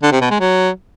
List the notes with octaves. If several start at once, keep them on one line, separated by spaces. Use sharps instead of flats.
D3
C3
B2
G#3
F#3